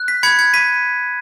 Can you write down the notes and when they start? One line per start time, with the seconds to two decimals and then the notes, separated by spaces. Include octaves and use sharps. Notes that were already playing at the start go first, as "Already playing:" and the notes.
Already playing: F#6
0.08 B6
0.23 B5 G#6 C#7
0.39 G#6 C#7
0.54 B5 B6 D#7